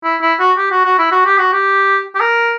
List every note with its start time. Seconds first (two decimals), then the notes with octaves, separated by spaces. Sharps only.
0.04 E4
0.21 E4
0.40 F#4
0.58 G4
0.71 F#4
0.85 F#4
0.98 E4
1.12 F#4
1.26 G4
1.38 F#4
1.52 G4
2.15 G4
2.20 A#4